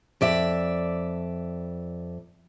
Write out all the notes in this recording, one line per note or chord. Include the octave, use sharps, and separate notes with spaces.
F2 D5 E5